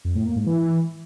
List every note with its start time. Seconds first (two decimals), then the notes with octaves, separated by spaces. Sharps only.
0.04 F2
0.15 A2
0.25 A#3
0.36 G#2
0.46 E3